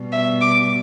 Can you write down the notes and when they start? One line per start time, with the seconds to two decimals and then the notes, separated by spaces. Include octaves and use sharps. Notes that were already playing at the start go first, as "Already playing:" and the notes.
Already playing: B2 G3
0.12 E5
0.41 D6